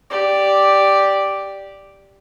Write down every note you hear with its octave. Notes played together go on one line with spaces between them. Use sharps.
G4 D5